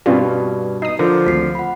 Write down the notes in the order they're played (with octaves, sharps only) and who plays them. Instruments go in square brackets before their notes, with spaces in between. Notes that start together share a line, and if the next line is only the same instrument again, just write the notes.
[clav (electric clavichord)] G2 B2 [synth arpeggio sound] C4 C#4 F4 [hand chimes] G4 B4 D5
[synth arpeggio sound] D#4 D#6 [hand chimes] C7
[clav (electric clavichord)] D3 [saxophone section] F3 [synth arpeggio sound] A#4
[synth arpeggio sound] G#1 D2 [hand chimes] B6 C7
[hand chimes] F#5 B5